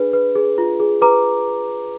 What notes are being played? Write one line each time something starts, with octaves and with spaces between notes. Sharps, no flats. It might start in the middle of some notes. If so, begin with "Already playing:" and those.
Already playing: D4 G#4 B4
B4
G#4
F4
G#4
B4 A#5 D6